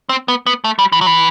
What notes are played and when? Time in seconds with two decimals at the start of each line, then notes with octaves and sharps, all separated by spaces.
0.09 C4
0.28 B3
0.46 B3
0.64 A3
0.79 G3
0.92 E3
1.01 F#3
1.06 E3